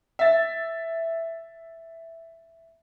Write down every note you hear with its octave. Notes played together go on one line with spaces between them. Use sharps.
E5 A6